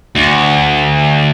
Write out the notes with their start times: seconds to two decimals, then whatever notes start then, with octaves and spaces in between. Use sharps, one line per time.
0.16 D2